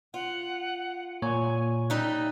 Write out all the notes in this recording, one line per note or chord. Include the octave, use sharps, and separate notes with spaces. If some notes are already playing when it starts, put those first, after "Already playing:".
F4 F#5
A#2 C#5 G#5
G3 D#4 E5 F#6